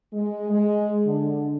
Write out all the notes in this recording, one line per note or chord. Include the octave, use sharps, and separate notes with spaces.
G#3
G#3
D3